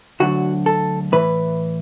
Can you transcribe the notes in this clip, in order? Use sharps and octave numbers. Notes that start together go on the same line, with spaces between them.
D2 D3 F#3 F#4
A4
A2 E3 B4